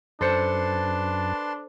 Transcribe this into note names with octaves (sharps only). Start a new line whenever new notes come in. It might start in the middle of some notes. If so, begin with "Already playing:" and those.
F#2 D4 A4 B4 C5 A5 C6 C#7